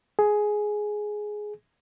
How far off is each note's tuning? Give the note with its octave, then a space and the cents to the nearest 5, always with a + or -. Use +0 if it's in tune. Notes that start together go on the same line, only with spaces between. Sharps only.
G#4 +10